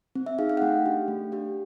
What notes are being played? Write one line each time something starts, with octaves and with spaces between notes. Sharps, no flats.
C4
E5
D#4 G#4 F5
F5
F#5
A3 G5
D4 G4
A3
D4 G4